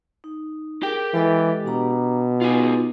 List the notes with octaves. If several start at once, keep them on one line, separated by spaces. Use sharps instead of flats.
D#4
G4 G#4 A#4 G5
E3 G#3 A4 D#5
B2 D4 A#5 D6
B3 D#4 F4 G#4